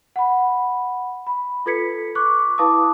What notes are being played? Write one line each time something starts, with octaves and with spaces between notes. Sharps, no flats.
F#5 B5
B5
F4 A4 B4 G#6 B6 C#7
C#6 D6 F#6
E4 B4 F5 A5 D6 D#6